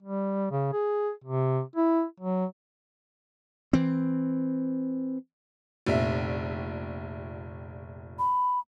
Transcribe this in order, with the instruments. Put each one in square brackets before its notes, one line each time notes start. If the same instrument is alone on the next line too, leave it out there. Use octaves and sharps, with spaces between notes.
[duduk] G3
C#3
G#4
C3
E4
F#3
[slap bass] E3 C4
[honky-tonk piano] F1 A#1 E5
[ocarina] B5